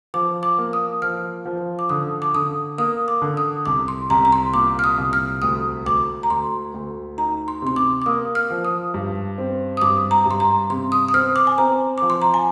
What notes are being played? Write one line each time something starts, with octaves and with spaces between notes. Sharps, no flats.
F3 D6
D6
A#3
D#6
F3 F6
F3
D6
D3 D#6
D6
D3 D#6
A#3 D#6
D6
D3
D#6
C2 D6
C6
C2 A#5
A#5
C6
A#2 D6
F6
D#6
C2
F6
D2 D#6
D2 D6
A#5
D2 C6
D2
D#4 A#5
C6
C3 C6
D6
D6
A#3 D#6
F6
F3
D#6
G2
C4
D#6
G2 D6
A#5
G2 C6
A#5
C3 C6
D#6
D#6
C4 F6
D6
G#5
C4 A#5
F3 D6
C6
A#5
G#5